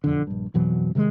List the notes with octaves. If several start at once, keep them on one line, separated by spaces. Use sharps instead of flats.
E1 F2 D3
A#1 G2
F2 B2 E3 F#3
C3 D#3 F3 G#3